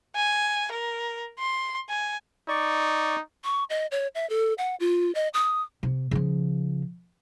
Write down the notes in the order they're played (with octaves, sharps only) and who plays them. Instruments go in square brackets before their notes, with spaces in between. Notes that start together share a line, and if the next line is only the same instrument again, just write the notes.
[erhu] G#5
A#4
C6
G#5
[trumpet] D#4 [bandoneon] D5 C#6
[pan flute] C#6
D#5
C#5
E5
A4
F#5
F4
D#5
D#6
[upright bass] C3
C#3 F3